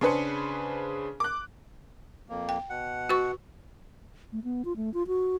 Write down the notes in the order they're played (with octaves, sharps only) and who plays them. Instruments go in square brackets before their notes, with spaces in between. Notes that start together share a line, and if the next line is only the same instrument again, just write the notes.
[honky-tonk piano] C#3 D4 G#4 B4 C5 C#7
D6 F#6
[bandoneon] F2 A#3
[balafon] G5
[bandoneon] B2 F#5
[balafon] F#4 B4 C#6
[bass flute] A3
B3
F4
A3
F4
F#4